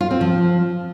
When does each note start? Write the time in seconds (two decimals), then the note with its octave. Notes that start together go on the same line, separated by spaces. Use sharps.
0.01 F4
0.11 C4
0.21 F3